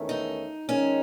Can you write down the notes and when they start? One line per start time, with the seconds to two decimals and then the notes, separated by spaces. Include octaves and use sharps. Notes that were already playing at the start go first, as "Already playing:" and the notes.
Already playing: E2 D#3 A3 C#4
0.09 D#4
0.69 D#3 G#3 C#4 D#4